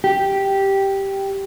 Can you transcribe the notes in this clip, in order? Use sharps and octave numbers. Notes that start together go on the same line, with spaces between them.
G4